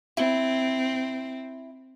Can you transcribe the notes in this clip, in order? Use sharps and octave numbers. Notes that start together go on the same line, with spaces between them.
C4 E4